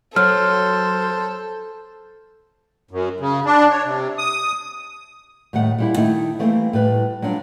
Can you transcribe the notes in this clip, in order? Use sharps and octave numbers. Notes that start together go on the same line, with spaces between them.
F#3 A4 C5 F6
F#2
C#3
D4
C#5
C3
D#6
A2 D#3 G3 F#5
A#2 G3 E4
D#3 A3 D#4 E4
E3 G3 A3 A#3 C4
A2 G3 B4
F#3 G3 D4 F4